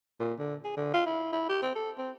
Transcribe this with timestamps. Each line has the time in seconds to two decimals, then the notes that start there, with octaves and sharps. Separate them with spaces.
0.20 A#2
0.39 D3
0.65 G#4
0.77 D3
0.94 F4
1.06 E4
1.33 E4
1.49 G4
1.63 C4
1.75 A4
1.98 C4